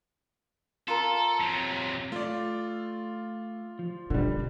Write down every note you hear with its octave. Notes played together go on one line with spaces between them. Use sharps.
F4 A4 A#4
C3 F#3
A3 F4 D5
F3
B2 D3 G3